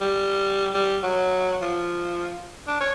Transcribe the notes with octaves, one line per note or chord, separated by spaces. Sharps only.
G3
G3
F#3
F3
D4
C#5